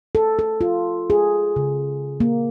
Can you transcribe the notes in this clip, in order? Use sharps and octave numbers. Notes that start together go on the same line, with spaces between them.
A4
A4
F4
G#4
C#3
A#3